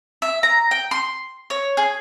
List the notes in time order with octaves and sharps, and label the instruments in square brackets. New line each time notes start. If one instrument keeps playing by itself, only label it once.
[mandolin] E5
A#5
G5
C6
C#5
G#4